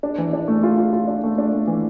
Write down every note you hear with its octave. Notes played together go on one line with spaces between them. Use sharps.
D4
E3
D4
A3
F4
F4
F4
D4
A3
D4
A3
E3